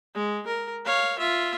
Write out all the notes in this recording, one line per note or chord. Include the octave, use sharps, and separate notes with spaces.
G#3
A#4
C#5 F5
F4 E5